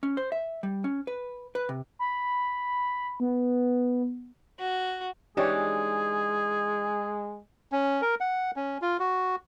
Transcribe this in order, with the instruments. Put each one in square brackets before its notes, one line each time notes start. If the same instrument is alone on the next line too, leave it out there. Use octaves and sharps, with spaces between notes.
[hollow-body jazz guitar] C#4
C5
E5
G3
C#4
B4
B4
C3
[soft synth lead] B5
B3
[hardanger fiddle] F#4
[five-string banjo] E3 D4 D#4 [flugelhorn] G#3 [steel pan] G4 C#5 D#5 [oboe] G#4
[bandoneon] C#4
A#4
F#5
C#4
F4
F#4